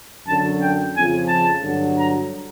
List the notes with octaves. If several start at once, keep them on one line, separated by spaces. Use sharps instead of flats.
F#2 D3 F#3 A5
G5
F2 C#3 F3 G#5
A5
G2 D3 F#3
A#5